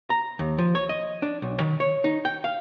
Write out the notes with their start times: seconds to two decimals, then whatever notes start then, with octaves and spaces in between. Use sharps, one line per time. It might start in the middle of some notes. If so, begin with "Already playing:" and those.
0.10 A#5
0.39 D#2
0.58 F3
0.75 C#5
0.89 D#5
1.22 D4
1.42 B1
1.60 D#3
1.80 C#5
2.04 D#4
2.25 G5
2.44 F5